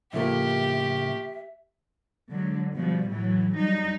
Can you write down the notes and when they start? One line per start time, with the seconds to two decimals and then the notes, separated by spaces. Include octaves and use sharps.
0.13 A2 C#3 F3 A3 A#3 G4 E5
2.31 D3 F#3 G#3
2.73 B2 F3 G3
3.09 A2 E3 F#3
3.56 F#3 G3 D#4